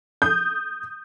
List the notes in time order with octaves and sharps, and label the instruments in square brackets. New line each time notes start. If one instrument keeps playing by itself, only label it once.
[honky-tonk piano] D#6 G6